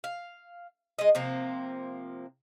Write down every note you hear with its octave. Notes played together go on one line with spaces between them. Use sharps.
F5
G#3 D#5
C3 F3 A#3 C4